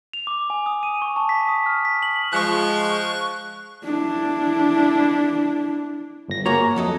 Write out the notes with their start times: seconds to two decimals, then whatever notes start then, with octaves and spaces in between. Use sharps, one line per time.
0.13 F7
0.27 D6
0.50 G#5
0.66 D#6
0.83 D#7
1.02 C#6
1.16 A5
1.29 B6
1.48 D#6
1.66 F6
1.85 B6
2.03 F#7
2.33 F3 G#3 C#6 F#6
3.84 D4 E4
6.28 G1 A#6
6.46 G#2 A#3 F#4 C#5 A#5
6.76 F2 F#3 A4 D#5